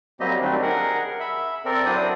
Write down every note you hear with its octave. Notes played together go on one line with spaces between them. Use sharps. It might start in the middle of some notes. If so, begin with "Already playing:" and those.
F#3 G3 A#3 C4 G4 D#5
D#3 F#3 G3 A3 C4 D4
G#4 A#4 F#5
E5 B5
C4 A4 A#4 D5
F#3 D4 E4 C5 D5 D#6